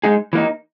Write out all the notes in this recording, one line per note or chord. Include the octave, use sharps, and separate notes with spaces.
G#3 D#4 G#4
E3 A#3 D#4